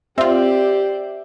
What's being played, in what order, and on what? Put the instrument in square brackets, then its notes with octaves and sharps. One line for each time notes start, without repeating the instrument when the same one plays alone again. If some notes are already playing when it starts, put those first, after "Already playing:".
[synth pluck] C4 F4 [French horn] G4 [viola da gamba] C5 D5 [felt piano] E5